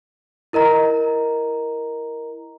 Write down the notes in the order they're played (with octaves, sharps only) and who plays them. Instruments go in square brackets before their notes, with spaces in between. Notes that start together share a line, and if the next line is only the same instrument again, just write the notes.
[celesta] E4 A#4 D#5 A#5